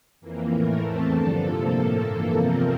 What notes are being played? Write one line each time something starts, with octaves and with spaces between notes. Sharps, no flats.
F2 E3 A#3
A2 E3 A3 A#4
E2 E3 A3 C4 A4
G2 D3 F3 A4
C3 F3 A#3
A2 F3 A#3 A4
G2 E3 A#3
E2 C3 F3 C4 A#4